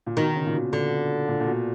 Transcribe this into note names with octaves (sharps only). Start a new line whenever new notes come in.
A#2
B2 D#3
C#3
A#2
B2
D3
A#2
A#2
B2